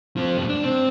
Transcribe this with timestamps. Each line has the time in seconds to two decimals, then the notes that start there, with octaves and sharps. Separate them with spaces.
0.17 F3 C4
0.38 G2 B2
0.49 D4
0.64 C4